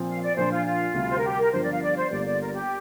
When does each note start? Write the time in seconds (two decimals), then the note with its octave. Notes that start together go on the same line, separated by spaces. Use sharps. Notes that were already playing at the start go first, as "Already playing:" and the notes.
Already playing: A#2 F3 C4
0.08 F5
0.22 D5
0.36 A#2 F3 D4 C5
0.51 F4
0.66 F4
0.94 D2 C3 G3
1.10 C5
1.17 A#4
1.24 G4
1.38 A#4
1.53 G1 G2 F3 D4 C5
1.63 D5
1.72 F5
1.82 D5
1.96 C5
2.11 G1 G2 D3 G3 A#3 D5
2.25 D5
2.40 A#4
2.54 G4